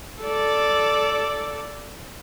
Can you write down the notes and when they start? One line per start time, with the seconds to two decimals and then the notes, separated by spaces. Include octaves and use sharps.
0.23 A4 D5